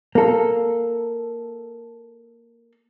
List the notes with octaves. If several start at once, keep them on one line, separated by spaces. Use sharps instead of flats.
A#3 A4